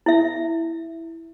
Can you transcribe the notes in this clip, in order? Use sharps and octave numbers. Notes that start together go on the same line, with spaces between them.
E4 E5